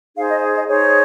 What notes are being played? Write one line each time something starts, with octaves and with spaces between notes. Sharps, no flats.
D#4 G#4 C5 F5
D#5
D#5
D#4 G#4 C5 C#5